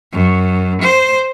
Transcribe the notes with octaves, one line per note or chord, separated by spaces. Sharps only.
F#2
C5